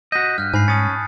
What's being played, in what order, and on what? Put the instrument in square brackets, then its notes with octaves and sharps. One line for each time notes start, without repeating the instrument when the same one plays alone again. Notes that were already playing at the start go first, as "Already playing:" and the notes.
[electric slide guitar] F#4 D#5 [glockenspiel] G6 B6
[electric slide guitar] G2 [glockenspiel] F6 F#6
[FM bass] G#2 [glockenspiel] G#5 B5 C7
[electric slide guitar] C#4 [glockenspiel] A5 D#6 A6